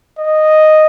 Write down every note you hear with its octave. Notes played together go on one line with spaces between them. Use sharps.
D#5